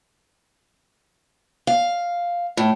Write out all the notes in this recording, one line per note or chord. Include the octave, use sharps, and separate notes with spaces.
F5
A2